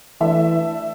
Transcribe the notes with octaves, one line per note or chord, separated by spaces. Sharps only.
E3 A3 D4 A4 E5